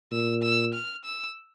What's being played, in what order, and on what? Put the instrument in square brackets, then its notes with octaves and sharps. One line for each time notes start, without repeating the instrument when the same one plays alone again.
[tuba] A#2 [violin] E6
[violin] E6
F6
E6